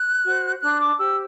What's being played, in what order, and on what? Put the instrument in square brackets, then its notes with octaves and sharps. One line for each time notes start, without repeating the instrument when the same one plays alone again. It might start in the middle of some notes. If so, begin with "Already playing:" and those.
Already playing: [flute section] F#6
F#4 C5
D4 F#6
D6
G4 C5 E6